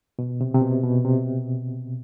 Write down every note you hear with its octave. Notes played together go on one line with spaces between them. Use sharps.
B2
C3
C3
B2
B2
C3